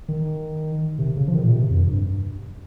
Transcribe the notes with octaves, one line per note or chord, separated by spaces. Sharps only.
D#3
C3
C#3
F3
D#3
A#2
C3
F2
G2